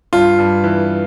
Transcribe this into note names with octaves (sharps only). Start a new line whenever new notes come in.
G2 F4
G2
E3